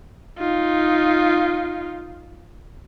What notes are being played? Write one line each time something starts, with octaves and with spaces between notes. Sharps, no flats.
D#4 F4